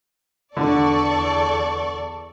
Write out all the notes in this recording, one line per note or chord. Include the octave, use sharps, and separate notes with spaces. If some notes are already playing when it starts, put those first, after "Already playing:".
E2 D3 A4 D5 C#6